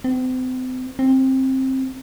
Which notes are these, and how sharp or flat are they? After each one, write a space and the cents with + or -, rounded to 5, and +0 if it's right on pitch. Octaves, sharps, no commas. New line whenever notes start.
C4 -40
C4 +15